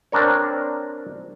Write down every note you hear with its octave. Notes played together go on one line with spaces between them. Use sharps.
C4 D4 A#4 C#5